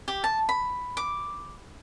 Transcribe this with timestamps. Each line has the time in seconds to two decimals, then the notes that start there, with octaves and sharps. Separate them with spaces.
0.08 G4
0.24 A5
0.49 B5
0.97 D6